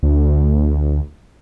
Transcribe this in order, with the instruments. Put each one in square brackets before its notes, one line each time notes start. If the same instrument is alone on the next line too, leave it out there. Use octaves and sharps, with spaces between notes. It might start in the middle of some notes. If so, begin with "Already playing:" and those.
[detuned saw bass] D2